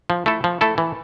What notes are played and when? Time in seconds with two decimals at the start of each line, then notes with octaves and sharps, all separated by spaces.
0.10 F3
0.26 A3 E4 A4
0.44 F3
0.61 A3 E4 A4
0.78 E3